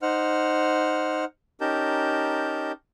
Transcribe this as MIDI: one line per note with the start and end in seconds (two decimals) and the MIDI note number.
0.02 1.25 63
0.02 1.25 72
0.02 1.25 78
0.02 1.25 89
1.61 2.72 61
1.61 2.72 63
1.61 2.72 67
1.61 2.72 70
1.61 2.72 81
1.61 2.72 91